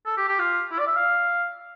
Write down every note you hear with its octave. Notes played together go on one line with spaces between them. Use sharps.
A4
G4
G4
F4
E4
D5
E5
F5